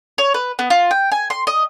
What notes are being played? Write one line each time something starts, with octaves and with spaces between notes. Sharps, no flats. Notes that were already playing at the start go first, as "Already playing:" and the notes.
C#5
B4
B3
F4
G5
G#5
C6
D#5